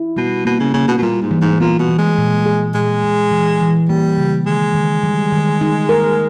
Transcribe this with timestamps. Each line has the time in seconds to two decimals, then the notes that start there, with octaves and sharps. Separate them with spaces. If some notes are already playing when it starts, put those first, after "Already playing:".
Already playing: E4
0.16 B2 G3
0.45 B2 A#3
0.60 C#3
0.74 C#3 A#3
0.88 B2
0.98 B2
1.02 A#2 G3
1.22 G#2
1.31 E3
1.41 G#2
1.60 A#2 B3
1.79 B2
1.88 E3
1.98 G#3
2.18 A#2
2.46 G#4
2.74 A#2 G#3
3.03 A#2
3.31 E3
3.61 E3
3.88 G3 A#3
4.17 C#3
4.46 D#3 G#3
4.74 D#3
5.04 G3
5.32 D#3
5.61 D#4
5.89 A#4